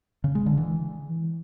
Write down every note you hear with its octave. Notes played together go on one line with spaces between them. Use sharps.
C#3
G#3
D3
E3